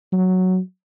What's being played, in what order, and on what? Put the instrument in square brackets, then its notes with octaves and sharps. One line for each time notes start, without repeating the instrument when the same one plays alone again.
[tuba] F#3